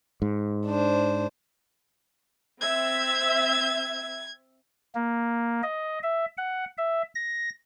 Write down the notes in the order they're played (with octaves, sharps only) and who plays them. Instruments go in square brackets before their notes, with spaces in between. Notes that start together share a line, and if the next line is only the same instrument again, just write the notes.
[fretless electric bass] G#2
[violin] D4 C5
[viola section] C4 E5 [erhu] G#6
[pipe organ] A#3
D#5
E5
F#5
E5
A#6